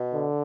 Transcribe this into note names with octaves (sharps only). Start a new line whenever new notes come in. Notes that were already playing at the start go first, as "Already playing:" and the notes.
Already playing: B2
D3